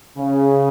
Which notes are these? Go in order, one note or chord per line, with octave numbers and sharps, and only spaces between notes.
C#3